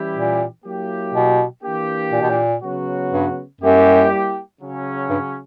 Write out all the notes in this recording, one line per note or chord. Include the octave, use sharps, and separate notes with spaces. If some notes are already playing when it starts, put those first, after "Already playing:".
Already playing: E3 G3 C#4 E4 G4
A#2
F#3 A#3 E4 G4
B2
E3 A#3 D4 G4
A#2
B2
A#2
C#3 F#3 B3 F#4
G2
F#2 G3 A#3 E4 G4
C#3 F#3 C#4
G2